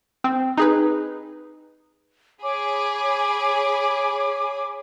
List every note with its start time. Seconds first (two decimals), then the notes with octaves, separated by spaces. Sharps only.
0.24 C4
0.58 D#4 G#4 B4
2.43 G#4 C#5 G#5 B5 D6